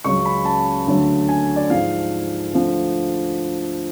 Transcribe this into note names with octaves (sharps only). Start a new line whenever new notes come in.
C#2 C#3 F#3 C#6
B5
A5
D2 D3 F#3
G#5
D5
G#2 F3 F5
D2 D3 F3